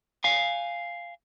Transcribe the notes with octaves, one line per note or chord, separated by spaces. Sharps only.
F5 G#5